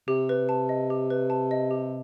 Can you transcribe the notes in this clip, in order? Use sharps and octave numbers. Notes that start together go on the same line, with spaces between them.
C3 G4
B4
A5
D#5
G4
B4
A5
D#5
G4